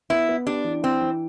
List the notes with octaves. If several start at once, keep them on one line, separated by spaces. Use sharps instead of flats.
B3 E4
B3
D4 G4
E3
C4 E4
E3